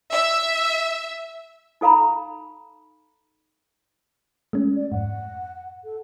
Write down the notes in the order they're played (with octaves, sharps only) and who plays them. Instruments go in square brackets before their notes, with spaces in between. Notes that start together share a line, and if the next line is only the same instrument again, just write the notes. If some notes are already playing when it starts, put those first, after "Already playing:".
[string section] E5
[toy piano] D#4 A4 F5 A#5 B5
[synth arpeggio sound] G#3 A3 C#4
[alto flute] D5
[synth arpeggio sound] F2 G#2 [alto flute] F#5
[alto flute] A4